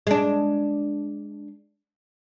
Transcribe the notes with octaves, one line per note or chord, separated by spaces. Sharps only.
G#3 D4